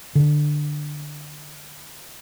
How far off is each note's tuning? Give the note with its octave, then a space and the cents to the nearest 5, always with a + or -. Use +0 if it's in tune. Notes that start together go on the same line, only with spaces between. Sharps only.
D3 +15